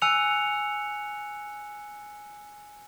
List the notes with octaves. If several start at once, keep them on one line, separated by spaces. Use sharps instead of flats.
G#5 E6 F#6 C#7 F7